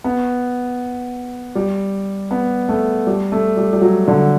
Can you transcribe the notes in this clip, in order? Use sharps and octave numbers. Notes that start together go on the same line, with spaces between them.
B3
G3
B3
A3
G3
A3
G3
G3
F#3
D3